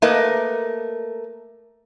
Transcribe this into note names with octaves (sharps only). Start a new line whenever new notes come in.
A3 A#3 A#4 B4 D#5